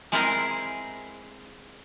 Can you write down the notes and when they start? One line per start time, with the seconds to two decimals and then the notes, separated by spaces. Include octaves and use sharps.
0.12 G#3 C4 E4 G#4 A#4